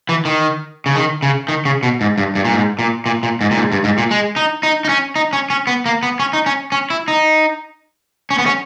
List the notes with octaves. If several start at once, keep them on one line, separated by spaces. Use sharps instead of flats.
E3
D#3
C#3
D#3
C#3
D#3
C#3
B2
G#2
G2
G2
A#2
G#2
A#2
A#2
A#2
G#2
A#2
G#2
G2
G#2
A#2
G#3
D#4
D#4
D#4
C#4
D#4
C#4
C#4
B3
A#3
B3
C#4
D#4
C#4
C#4
E4
D#4
C#4
B3
C#4